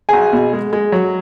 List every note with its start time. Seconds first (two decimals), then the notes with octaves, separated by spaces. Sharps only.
0.09 B1 G#4 G#5
0.33 B2
0.53 G#3
0.73 G#3
0.92 F#3